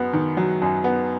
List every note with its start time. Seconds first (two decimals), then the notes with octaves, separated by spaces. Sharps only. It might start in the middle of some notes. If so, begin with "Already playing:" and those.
Already playing: F#2 B3
0.13 D#3
0.37 F#3
0.62 F#2
0.84 B3